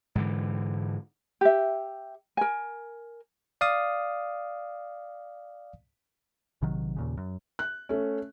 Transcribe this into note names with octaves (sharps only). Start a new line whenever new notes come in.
G#2 D3 E3
G4 E5
A#4 G#5
D5 F5 D#6
A#1 C3 D#3 F#3
D#2 A#2 C#3
F#2
F#6
A3 C#4